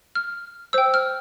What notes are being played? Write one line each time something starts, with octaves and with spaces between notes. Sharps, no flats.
F6
C5 G5 E6
F6